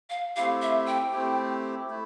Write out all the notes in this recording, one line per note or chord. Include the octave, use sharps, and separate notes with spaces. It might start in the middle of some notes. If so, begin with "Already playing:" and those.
F5
A3 C4 E4 G4 F5
E5
G5
A3 C4 E4 G4
A3 E4